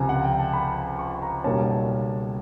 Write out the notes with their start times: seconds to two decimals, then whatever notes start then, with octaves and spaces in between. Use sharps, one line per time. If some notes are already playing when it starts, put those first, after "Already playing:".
Already playing: C#2 C3 F3 G#5 A#5
0.09 F#5
0.24 G5
0.39 A5
0.53 B5
0.99 C#6
1.22 A#5
1.44 B1 B2 G3 A#3 C#4 A5